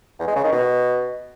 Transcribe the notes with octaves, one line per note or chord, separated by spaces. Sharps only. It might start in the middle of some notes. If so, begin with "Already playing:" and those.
E2
G#3
C#3
D#3
B2